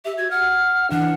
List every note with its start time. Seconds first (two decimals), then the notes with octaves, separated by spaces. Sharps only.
0.05 G4 E5
0.18 F#4 G#6
0.31 F#5 F6
0.91 E3 D4 F#5